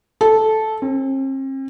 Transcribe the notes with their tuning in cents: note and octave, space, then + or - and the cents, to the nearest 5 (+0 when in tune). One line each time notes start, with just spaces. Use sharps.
A4 -10
C4 +45